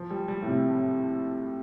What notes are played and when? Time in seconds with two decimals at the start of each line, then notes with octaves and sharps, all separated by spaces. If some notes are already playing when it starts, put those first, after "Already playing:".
Already playing: F3
0.11 G3
0.28 G3
0.42 A2
0.47 C3